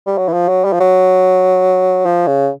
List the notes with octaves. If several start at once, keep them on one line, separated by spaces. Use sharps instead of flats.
G3
F#3
E3
F3
F#3
G3
F3
F#3
F3
C#3